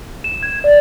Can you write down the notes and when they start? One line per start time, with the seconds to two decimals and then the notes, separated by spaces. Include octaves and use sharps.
0.24 E7
0.43 G#6
0.64 D5